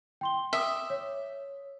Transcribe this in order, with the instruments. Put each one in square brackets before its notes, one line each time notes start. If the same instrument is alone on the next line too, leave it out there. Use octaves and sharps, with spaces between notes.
[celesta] G5 C6 G7
[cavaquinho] E5 [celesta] D6 D#6
[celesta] C#5